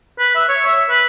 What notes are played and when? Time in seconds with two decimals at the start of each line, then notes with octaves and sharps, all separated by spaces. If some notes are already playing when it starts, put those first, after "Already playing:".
0.19 B4
0.35 E5
0.49 C#5
0.67 E5
0.90 B4